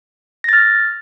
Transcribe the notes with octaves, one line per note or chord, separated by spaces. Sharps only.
F6 A6 A#6